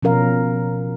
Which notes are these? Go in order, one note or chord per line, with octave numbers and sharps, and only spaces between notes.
B2 F3 C#4 A#4 F5